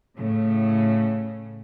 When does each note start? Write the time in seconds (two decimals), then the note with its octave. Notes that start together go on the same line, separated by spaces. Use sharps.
0.16 A2 C#3